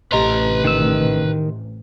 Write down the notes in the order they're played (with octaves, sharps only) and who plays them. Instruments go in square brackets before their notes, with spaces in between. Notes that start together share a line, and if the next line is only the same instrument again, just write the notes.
[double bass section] A1 C3 [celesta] G4 D#5 C6 [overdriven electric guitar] B4 A#5
[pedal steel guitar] D#3 E6